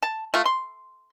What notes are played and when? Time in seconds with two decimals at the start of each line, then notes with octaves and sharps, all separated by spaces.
0.03 A5
0.34 A3 F4
0.46 C6